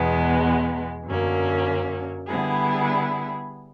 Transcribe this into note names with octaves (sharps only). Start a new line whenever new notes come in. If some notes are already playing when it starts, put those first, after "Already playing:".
Already playing: E2 B2 G#3 B3
F#2 D3 F#3 A#3 C#4
D3 G3 B3 E4 G#4